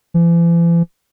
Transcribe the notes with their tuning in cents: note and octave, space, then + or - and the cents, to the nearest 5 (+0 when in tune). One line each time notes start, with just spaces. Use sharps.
E3 +45